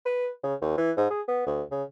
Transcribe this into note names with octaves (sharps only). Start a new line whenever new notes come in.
B4
C#3
D#2
E3
G#2
G#4
B3
D2
C#3